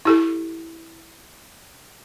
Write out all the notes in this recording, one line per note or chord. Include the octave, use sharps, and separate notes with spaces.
E4 G4 A4